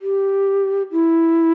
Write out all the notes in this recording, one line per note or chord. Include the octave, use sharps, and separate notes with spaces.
G4
E4